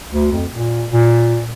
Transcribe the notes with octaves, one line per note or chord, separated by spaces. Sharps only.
D2
F2
A#2
A#2